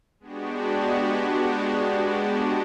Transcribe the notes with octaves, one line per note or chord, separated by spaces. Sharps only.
G#3 B3 D4 F#4 G4